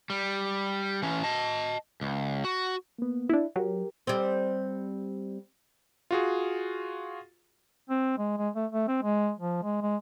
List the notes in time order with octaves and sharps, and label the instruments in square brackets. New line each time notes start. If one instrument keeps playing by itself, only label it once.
[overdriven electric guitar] G3
E3 C#4
D#5 A5
C#2
F#4
[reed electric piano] A#3 B3
[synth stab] D4 E4
[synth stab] F#3 [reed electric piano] G4 A#4
[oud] G3 C4
[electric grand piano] F4 F#4 G#4
[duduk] C4
G#3
G#3
A3
A3
C4
G#3
F3
G#3
G#3